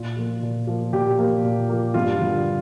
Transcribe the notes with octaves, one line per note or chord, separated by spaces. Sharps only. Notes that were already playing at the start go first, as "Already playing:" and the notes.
Already playing: A#2 F4
F3 A#3
A#2
F3 A#3
A#2 G4
F3 A#3
A#2
F3 A#3
G2 F4
D3 G3